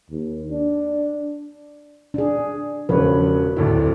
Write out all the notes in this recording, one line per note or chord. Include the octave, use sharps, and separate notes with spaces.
D#2
D4
D4 G#4
E1 C#3 F3 B4 C#5
D1 D2 E4